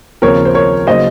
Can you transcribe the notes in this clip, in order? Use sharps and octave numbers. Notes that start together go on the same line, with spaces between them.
D#2 C#3 F3 C4 A#4 C#5
C5
A#4 C#5
C#3 F#3 A#3 D#4 C5 D#5